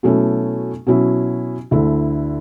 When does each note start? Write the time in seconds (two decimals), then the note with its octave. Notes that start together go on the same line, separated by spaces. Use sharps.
0.03 B2 F#3 A3 C#4 E4
0.87 B2 F#3 C#4 E4
1.71 D2 D3 A3 E4